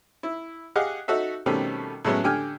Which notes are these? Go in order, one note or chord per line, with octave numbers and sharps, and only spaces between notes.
E4
G4 G#4 D#5 F5 F#5
D#4 F#4 A4 E5
B2 D#3 G3 A3 C4 C#4
A2 F#3 G#3 B3 C#4
D3 G4 G5 G#5 F6